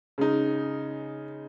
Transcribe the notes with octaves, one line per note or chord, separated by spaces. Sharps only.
C#3 G#3 D#4